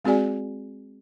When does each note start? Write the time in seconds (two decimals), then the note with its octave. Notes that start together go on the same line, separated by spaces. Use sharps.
0.05 G#3 C4 F#4 G#4 D5 G#5